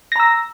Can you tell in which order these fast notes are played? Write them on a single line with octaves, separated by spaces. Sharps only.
A#6 A#5 E6